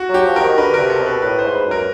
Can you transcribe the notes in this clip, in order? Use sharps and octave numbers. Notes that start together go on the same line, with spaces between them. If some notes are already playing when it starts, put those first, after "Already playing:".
Already playing: F#4
F#3 G4
F3
D#3 A#4
D3 B4
C3 A#4
A4
B2
B4
A2 B4
C5
G#2
B4
F#2 A#4